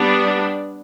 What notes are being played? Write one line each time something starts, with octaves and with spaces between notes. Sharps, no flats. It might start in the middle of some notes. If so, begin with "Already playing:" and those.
Already playing: G3 B3 D4